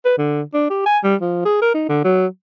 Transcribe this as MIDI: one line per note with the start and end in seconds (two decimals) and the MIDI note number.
0.05 0.16 71
0.18 0.42 50
0.54 0.65 62
0.70 0.84 67
0.86 0.99 80
1.04 1.15 55
1.21 1.40 53
1.45 1.58 68
1.62 1.73 70
1.74 1.89 63
1.89 2.00 50
2.04 2.26 54